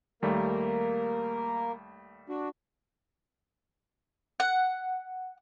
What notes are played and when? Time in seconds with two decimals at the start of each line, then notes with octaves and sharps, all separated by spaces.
0.22 D#2 G3 A3 A#3 A#4
2.29 D4 F#4
4.40 F#5